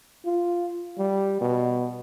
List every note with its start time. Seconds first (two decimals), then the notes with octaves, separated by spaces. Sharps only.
0.25 F4
0.98 G3
1.41 B2